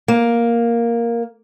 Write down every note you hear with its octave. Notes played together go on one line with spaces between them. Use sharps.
A#3